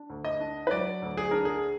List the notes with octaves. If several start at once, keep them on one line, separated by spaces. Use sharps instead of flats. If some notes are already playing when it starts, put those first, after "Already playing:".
Already playing: D4
D2
D#5
D4
B4
F#3 D5
D2
G#4
D4 A#4
G#4